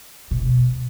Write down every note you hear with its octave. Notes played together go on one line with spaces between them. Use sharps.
B2